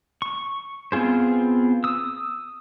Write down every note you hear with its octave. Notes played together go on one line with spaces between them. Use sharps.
C#6
B3 C4 F4 G#4 C5
D#6 E6